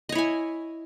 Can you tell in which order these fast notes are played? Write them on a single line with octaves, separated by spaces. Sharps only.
D#5 C#5 E4 G#5